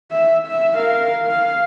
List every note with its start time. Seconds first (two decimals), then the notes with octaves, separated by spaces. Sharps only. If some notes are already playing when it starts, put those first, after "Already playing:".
0.12 E5
0.47 E5
0.76 A#4 F5
1.27 F5